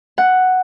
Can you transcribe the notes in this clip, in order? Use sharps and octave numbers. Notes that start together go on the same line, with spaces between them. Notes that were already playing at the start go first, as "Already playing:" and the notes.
F#5